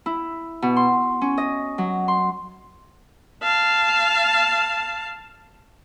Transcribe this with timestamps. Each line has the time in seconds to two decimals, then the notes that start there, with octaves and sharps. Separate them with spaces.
0.06 E4
0.62 B2
0.77 C6
1.21 C#4
1.38 D#5
1.78 F#3
2.08 C6
3.42 F5 A5